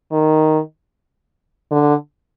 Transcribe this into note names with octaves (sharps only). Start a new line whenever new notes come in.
D#3
D3